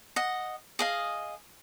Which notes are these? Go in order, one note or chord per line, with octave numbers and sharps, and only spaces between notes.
D#5 F#5
G#4 D#5 F5